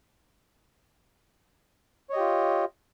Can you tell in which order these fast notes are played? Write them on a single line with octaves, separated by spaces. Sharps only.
C#5 D#5 G4 F4